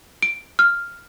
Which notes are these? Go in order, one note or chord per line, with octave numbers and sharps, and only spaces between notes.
D7
F6